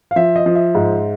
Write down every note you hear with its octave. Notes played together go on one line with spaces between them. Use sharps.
F5
F3 E5
D#5
F3
E5
G#2